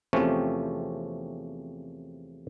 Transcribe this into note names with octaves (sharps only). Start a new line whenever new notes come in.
E2 C3 F3 A3 C4 C#4